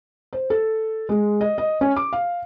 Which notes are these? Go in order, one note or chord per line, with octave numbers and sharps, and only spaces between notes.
C5
A4
G#3
D#5
D#5
C#4
D6
F5